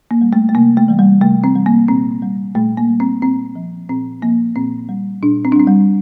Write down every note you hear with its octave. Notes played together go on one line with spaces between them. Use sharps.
A#3
G3
A3
A3
C3 A#3
A3
E3 G3
G3
C3 A3
C4
E3 G3
A#3
A#2 C4
G3
A#2 A3
A#3
G3
C4
A#2 C4
F3
A#2 C4
F3 A#3
A#2 C4
G3
A#2 D4
C4
D4
G3
C4
G3